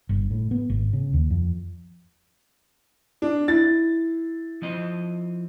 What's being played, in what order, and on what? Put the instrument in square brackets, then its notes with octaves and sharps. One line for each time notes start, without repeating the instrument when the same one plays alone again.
[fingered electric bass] G1
A2
B3
G#1
C#3
D#2
F2
[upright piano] D4
[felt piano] E4 [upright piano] A6
[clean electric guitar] F3 C4 D#5